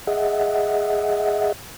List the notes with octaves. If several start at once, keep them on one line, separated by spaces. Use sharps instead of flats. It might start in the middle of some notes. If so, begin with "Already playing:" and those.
G#4 D#5 E5 F#5